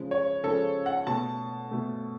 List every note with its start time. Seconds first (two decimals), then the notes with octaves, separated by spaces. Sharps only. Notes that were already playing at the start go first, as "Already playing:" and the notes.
Already playing: C#3 F3 G#3
0.11 C#5
0.43 C#3 F3 G#3 A4
0.86 F#5
1.07 B2 A3 A5
1.71 B2 A3